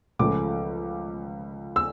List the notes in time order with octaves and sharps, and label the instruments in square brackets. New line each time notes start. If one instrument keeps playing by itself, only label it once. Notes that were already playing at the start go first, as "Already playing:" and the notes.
[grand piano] C#2 C#3 F3 A3 D6
E6